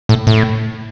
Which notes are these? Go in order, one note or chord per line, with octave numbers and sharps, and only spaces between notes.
A2
A2